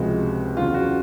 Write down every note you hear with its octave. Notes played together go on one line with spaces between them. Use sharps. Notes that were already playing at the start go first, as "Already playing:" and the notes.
Already playing: C#2 C3 F3 G#3 F#4
E2 C#3 F#3 F4
F#4